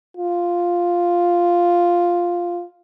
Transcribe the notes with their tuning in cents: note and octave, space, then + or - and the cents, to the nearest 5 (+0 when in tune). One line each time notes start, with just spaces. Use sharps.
F4 +0